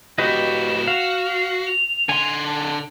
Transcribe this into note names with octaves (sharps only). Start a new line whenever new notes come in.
A2 F#4 G4 B4 D#5 E7
F#4 F5
C7
F7
D3 G#5 C6
A5